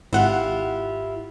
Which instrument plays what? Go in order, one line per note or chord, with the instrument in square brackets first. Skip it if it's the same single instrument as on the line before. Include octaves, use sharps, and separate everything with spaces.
[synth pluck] G#1 F#5 [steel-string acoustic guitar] E4 F4 G4